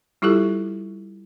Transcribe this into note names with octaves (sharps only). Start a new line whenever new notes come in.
G3 E4 F4 G4 A4